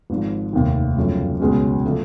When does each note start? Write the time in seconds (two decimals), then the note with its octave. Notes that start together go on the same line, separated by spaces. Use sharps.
0.10 G#1 G#2 F3
0.53 F1 D#2 D#3
0.97 G1 F#2 C#3 F3 A3
1.40 C#2 B2 G#3 C#4 F#4
1.85 D3 F3 A3 D4